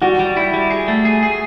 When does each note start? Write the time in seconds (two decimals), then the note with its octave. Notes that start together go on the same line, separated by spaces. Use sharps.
0.01 G3 F#4
0.19 G3
0.37 E4
0.54 G3
0.71 G#4
0.88 A3
1.05 G#4
1.23 G#4